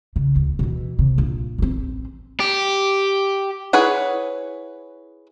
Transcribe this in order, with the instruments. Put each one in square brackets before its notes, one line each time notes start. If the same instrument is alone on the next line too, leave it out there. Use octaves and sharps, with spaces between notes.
[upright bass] C#3
D2
B2 E3
C3
A#1
A1 C4
[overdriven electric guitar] G4
[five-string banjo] E4 G#4 B4 C#5 F#5